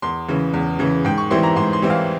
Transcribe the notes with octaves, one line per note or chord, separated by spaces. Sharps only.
E2 C6
C#3 E3
E2
C#3 E3
G#2 G5
C#6
E3 G3 C4 E4 C6
A#5
G#2 C6
C6
E3 G3 C4 E4
F5